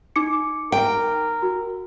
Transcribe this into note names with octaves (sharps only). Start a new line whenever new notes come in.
D#4 D6 C#7
A#4 G5
F#4